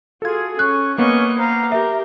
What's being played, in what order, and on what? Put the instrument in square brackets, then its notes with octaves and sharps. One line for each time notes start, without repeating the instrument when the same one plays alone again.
[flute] F4 [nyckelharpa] F#4 G#4 [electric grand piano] A4 G#6
[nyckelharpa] C#4 [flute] C#6 [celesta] F#6
[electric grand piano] A#3 B3 [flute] C#4 [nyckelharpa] D#5 C#6
[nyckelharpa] C5 F5 [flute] A#5
[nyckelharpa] G4 A#4 [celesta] E5